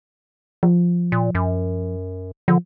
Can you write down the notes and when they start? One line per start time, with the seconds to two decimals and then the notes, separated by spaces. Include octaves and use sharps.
0.63 F3
1.12 A#2
1.35 F#2
2.48 D3 F3